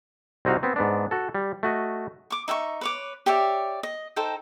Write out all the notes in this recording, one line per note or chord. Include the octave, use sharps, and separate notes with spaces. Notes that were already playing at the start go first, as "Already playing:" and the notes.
C2 C4 D#4 F#4 F5
B3 C4
G#2 B3 D4
F#4 A4
G3
A3 F#4 D#5
C#6 D6
D#4 E5 G5 C#6
B4 C#5 D6
G4 C#5 D5 E5
D#5
D#4 A4 C5 G5